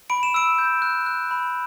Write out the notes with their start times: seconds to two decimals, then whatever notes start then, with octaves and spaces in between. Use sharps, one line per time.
0.10 B5 D7
0.23 E7
0.34 E6 D7
0.58 G6
0.82 F#6
1.06 F#6
1.31 B5